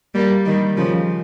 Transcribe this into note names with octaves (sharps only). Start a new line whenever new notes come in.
G3 A#3
D#3 G3
C#3 F3